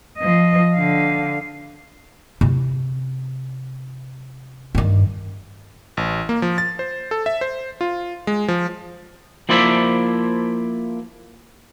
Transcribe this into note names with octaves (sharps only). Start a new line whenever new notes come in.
F3 D#5
D3 F5
C3 E4
G2 D#3
A1
A#3
F3
A6
C5
A4
E5
C5
F4
G#3
F3
F3 A#3 E4 C5 D5 E5